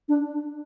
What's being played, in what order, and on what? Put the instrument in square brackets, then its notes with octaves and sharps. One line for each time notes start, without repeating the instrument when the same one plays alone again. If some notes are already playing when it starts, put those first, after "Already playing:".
[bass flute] D4